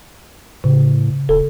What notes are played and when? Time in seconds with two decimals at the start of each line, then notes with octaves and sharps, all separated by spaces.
0.64 A2 C#3
1.29 D#1 A4